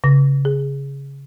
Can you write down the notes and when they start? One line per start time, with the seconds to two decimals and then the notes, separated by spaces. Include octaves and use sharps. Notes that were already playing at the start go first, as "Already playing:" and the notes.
0.04 C#3 A#6
0.45 G#4